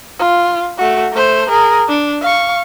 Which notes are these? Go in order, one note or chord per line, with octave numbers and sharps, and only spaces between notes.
F4
A3 F#4
A3 C5
G#4 A#4
D4
F5 C#6